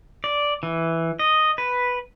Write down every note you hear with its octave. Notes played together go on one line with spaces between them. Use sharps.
D5
E3
D#5
B4